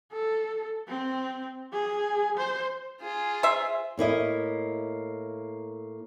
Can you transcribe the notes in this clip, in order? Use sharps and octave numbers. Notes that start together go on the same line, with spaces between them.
A4
C4
G#4
C5
F4 G#4
C5 E5
A2 A#3 E4 D#5